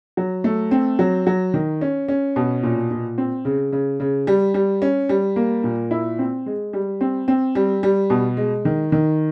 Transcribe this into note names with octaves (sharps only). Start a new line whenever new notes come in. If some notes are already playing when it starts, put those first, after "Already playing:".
F#3
A3
C4
F#3
F#3
D#3
C#4
C#4
B2
A#2
A#2
C4
C#3
C#3
C#3
G3
G3
C#4
G3
A#3
A#2
E4
C4
G#3
G3
C4
C4
G3
G3
B2
G#3
D#3
D#3